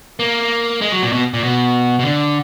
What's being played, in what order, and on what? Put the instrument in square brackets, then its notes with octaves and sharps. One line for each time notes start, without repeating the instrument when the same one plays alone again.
[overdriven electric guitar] A#3
G#3
F#3
A#2
B2
A#2
B2
B2
D3